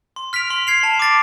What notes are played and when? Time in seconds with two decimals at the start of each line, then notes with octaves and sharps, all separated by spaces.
0.16 C6
0.33 F6 B6 D7 F7
0.50 C6
0.67 G#6 C7 F7
0.83 A5
0.99 D6 A6 D7